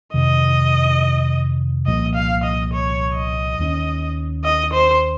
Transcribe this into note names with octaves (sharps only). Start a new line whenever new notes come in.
F2 C3 D#3 D#5
C2 A#2 F3 A#3 D#5
F5
D#5
C#5
D#5
D#2 D#3 G3 C#4
D#5
C5